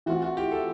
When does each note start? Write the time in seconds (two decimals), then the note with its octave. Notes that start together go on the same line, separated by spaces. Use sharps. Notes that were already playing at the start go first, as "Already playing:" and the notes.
0.06 E3 A3 C4 F4 F#4
0.22 F#4
0.37 G4
0.52 A4